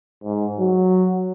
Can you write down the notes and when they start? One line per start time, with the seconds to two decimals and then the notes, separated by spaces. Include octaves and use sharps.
0.24 G#2
0.59 F#3